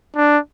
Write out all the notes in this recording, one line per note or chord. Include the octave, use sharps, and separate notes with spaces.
D4